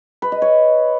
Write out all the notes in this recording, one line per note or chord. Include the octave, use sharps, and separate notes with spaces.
B4
D#5
C#5